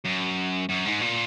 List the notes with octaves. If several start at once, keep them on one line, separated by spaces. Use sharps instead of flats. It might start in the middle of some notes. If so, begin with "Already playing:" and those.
F#2
F#2
G#2
A#2